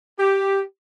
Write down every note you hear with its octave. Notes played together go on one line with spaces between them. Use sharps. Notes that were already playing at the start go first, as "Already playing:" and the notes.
G4